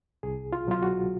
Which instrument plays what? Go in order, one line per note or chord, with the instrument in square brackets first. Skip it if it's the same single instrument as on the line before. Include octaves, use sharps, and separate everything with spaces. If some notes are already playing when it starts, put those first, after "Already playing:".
[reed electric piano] C2 G#4
F4
B2 F#3 F4
F#4